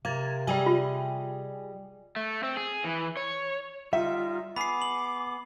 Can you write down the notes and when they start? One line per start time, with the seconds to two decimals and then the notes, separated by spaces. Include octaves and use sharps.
0.05 C3 A#4 F5 G#6 A6
0.47 G3 G#4 D5 D#5 G5 G#5
0.66 F4
2.16 A3
2.43 C4
2.57 G#4
2.84 E3
3.17 C#5
3.93 G3 D#4 F4 E5
4.56 B3 G#4 B5 D6 C7
4.82 F#7